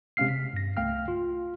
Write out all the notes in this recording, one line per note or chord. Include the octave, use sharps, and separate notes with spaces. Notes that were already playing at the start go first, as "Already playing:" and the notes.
C3 G#3 C#4 F5 F6 C7
B6
G2 A#6
C2 A3 F5 G5 F6
F4